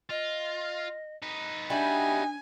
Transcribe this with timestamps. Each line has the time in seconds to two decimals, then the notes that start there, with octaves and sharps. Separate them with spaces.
0.10 F4 D#5
1.22 D#4 B4
1.70 G3 D4 E4 F#4 G#5